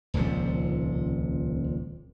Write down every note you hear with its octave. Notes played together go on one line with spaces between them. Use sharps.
D#1 C#2 C3 F3